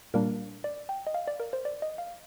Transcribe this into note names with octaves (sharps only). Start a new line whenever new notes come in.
A#2 G3 A#3 D4 A#4
D5
G5
D#5
F5
D5
A#4
C5
D5
D#5
F5